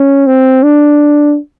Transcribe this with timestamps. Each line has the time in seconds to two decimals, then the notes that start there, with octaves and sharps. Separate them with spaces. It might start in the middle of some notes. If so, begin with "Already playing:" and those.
Already playing: C#4
0.27 C4
0.63 D4